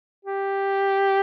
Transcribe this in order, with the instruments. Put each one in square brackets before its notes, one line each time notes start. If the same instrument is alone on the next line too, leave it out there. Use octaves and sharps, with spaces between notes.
[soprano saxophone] G4